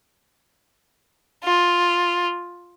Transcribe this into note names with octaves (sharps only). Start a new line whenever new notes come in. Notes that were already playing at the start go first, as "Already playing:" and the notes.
F4